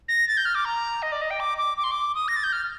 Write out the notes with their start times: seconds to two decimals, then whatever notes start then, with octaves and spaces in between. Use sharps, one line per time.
0.08 A#6
0.28 A6
0.37 G6
0.45 F6
0.55 D6
0.65 A#5
1.02 D#5
1.12 D5
1.21 D#5
1.31 G5
1.40 D6
1.58 D6
1.78 D6
1.84 C6
1.91 D6
2.15 D#6
2.28 A#6
2.36 A6
2.44 G6
2.52 F6